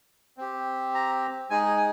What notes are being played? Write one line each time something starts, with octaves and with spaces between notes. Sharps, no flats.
C4 G4
A#5
G#3 D#4 G#4 G#5
G#5